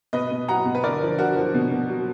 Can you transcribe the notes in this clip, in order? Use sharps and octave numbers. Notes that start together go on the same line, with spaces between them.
B2 B4 D#5
B2
F#3 F#5 A#5
B2
B4
D3 A#4 D5
F3
D3 F#4 A#4
F3
B2
B2
F#3